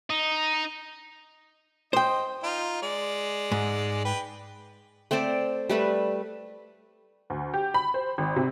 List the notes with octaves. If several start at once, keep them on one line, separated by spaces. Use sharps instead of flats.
D#4
C5 D#5 G5
D#4 F4
G#3 D5
G#2
B4 G5
A3 C4 C5 D5
G3 A3 B4
D2
G4
B5
C5
G#1
C3